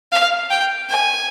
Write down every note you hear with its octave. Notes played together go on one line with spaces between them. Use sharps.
F5
G5
G#5